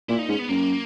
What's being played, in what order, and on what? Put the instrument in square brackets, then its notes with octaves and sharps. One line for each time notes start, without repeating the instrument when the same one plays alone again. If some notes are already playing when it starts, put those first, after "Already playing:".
[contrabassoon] A#2 [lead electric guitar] E4
[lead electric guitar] D#4
[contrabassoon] G#2 [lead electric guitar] C#4
[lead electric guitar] B3
[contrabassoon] F#2 [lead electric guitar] A#3